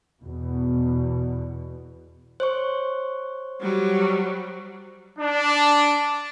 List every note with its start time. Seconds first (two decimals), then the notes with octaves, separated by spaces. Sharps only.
0.20 E2 B2
2.40 C5 C#5 C#6
3.61 F#3 G3
5.19 D4